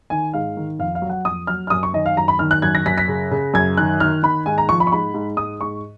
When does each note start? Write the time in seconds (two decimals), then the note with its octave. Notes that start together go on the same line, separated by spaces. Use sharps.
0.10 D#3 G#5
0.33 G#2 F5
0.57 D#3
0.79 F2 F5
0.95 F5
1.02 F#3
1.09 F#5
1.25 F2 D#6
1.47 F#3 F6
1.67 F6
1.70 F#2 D#6
1.83 C#6
1.93 D#3 D#5
2.06 F5
2.17 F#2 A#5
2.28 B5
2.39 D#3 F6
2.51 F#6
2.62 F#2 G#6
2.75 A#6
2.86 F#2 B6
2.98 B6
3.08 C#3
3.31 C#3
3.54 F#2 G#6
3.77 D#3 F#6
4.00 D#3 F6
4.23 D#3 B5
4.46 G#2 G#5
4.58 A#5
4.69 F3 C#6
4.80 B5
4.87 C#6
4.92 G#2 B5
5.14 G#2
5.37 G#2 D#6
5.60 G#2 C#6